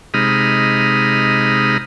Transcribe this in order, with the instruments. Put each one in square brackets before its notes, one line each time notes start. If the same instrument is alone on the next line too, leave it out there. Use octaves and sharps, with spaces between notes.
[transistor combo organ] C3 G#3 D#4 B5 D#6 F6